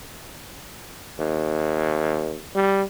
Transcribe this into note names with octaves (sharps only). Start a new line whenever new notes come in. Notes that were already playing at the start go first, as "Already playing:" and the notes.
D#2
G3